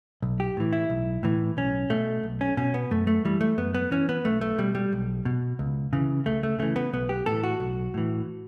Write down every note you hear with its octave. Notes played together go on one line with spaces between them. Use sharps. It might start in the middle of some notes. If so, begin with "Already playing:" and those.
B1
G4
A2 E3
E4
B1
A2 E3
B1 C#4
B2 A3
B1
C#4
B2 C#4
B3
F#2 A3
A3
E3 G3
A3
F#2 B3
B3
E3 C#4
B3
B1 A3
A3
B2 G3
G3
B1
B2
C#2
C#3 E3
C#2 A3
A3
C#3 E3 A3
B3
B1 B3
G4
A2 E3 A4
F#4
B1
A2 E3